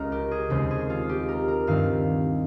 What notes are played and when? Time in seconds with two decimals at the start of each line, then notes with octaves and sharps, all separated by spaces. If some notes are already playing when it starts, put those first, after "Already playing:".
Already playing: C#2 C#3 G3 A#4
0.12 G4
0.31 G#4
0.50 D#2 C#3 G#3 C4 C5
0.71 G#4
0.90 F4
1.09 G4
1.29 A#4
1.48 A#4
1.67 G2 D#3 G3 C4 F5